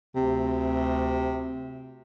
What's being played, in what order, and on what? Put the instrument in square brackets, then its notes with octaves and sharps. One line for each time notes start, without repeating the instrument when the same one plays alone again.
[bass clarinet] D2 [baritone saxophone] C3